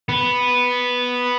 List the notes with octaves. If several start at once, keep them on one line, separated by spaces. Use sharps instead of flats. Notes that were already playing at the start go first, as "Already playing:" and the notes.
B3